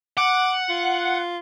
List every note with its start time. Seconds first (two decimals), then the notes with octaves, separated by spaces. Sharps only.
0.17 F#5 D6
0.69 F4